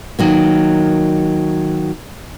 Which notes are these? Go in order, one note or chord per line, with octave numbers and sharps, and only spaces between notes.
D#3 F#3 A#3